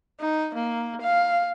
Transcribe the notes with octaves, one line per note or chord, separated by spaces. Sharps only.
D#4
A#3
F5